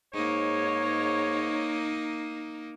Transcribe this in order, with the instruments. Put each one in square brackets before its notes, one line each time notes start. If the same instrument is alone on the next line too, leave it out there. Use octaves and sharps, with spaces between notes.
[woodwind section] G#2 C#5 [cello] A#3 D#4